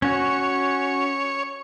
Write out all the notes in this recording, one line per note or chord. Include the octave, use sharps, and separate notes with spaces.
C#4 F#4 C#5